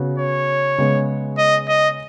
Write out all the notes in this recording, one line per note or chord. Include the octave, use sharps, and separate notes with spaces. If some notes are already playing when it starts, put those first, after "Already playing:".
Already playing: C#3 B3 F#4
C#5
C#3 G#3 B3
D#5
D#5